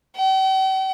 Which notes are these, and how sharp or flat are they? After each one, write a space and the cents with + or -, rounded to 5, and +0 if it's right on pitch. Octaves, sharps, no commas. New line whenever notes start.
G5 -45